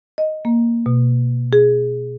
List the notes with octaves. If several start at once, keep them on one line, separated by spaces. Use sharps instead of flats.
D#5
A#3
B2
G#4